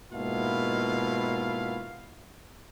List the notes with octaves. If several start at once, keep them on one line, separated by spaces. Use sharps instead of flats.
G#2 B2 A#3 E4 F4 F5